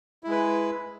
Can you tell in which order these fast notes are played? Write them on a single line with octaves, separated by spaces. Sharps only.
E4 G#3 B4